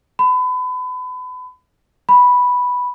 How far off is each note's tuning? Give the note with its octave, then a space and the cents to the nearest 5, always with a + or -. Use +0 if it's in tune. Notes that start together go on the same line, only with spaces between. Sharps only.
B5 +35
B5 -5